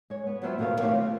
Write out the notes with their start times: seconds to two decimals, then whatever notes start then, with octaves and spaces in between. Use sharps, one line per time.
0.10 G#3 C#5
0.27 B3
0.43 F#3 B3 F4 C5 E5 G5
0.58 D#2 B2 D#3 B3 A#4 F5
0.80 A3 C4 G4 C5 C#5 F5
0.93 F4